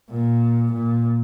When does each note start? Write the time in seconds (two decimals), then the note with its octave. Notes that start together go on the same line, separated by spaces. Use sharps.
0.10 A#2
0.72 A#2